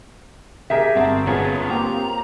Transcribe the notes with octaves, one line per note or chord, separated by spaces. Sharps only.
G4 G#4 A#4 E5
G1 C4 F#4 A5
C4 F4 G#4 A#4 B4 C#5
A#3 C4 G4 A#5